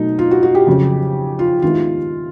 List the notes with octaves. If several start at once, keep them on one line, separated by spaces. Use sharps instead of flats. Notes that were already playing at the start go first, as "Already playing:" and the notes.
Already playing: B2 F#3 A3 D#4
F4
F#4
F#4
G4
F2 C#3 F#3
F4
D#2 D#3 G#3 B3 E4 F4